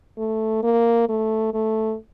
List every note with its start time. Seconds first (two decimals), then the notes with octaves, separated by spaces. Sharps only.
0.18 A3
0.63 A#3
1.09 A3
1.54 A3